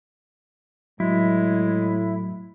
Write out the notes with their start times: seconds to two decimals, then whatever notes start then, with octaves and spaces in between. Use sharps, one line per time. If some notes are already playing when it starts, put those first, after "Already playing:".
1.00 A2 F#3 G#3 E4